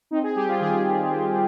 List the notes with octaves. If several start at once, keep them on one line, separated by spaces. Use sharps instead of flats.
C4 D#4
G#4
G3 G4
F4
D#3 G#4
D#3
C4